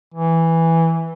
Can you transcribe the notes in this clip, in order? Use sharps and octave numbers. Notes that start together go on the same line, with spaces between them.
E3